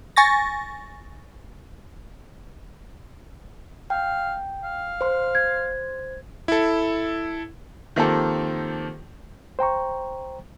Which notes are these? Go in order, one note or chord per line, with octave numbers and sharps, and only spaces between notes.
G#5 C#6 A6 A#6
F5 G5
F5
C5 C6
G#6
E4 A4
D#3 F3 A#3 C4 G4 A4
C5 G5 A#5 C#6